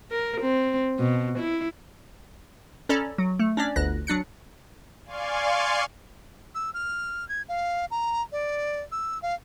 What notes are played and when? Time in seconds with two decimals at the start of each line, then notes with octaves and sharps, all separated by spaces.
0.11 A#4
0.41 C4
0.99 B2
1.39 E4
2.89 C#4 A4 D5 A#5 B5
3.18 F#3
3.39 A3
3.57 C#4 D4 D5
3.76 G1 D2 F#6 A#6
4.07 F#3 D4 F#6 C#7
5.06 D5 F5 G#5 C6 C#6
6.55 E6
6.74 F6
7.29 G#6
7.49 F5
7.91 A#5
8.32 D5
8.92 E6
9.22 F5